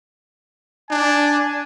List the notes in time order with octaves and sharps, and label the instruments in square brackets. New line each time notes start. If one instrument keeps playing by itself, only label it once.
[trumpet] D4 [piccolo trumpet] G#5